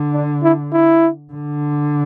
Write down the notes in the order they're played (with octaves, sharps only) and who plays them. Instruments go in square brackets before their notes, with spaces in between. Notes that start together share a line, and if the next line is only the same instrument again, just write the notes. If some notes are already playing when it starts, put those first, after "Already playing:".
Already playing: [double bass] D3
[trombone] D4
E4
E4
[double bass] D3